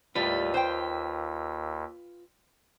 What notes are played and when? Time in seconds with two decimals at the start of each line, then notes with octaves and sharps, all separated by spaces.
0.15 D#2 A2 G3 F4 B4
0.54 C5 G5